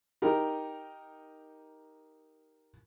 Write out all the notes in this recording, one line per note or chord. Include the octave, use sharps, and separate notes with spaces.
D#4 G4 A#4